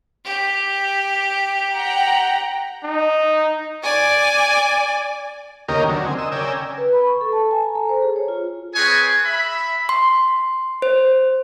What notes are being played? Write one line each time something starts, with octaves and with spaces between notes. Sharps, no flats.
G4
F#5 G5 A#5
D#4
D5 G#5
D#2 C#3 A#3 G4 A#4 D#5
D3 F#3
C4 G#5
D#5 E6
C#3 A#4 D5 G5 G#5 E6
B4
B5
C#6
A4
A5
G#5
A#5
A4
C5
G#4
C#5
F4
C4 G#4 B4 C#5 G#5
E5 B5
C6
C5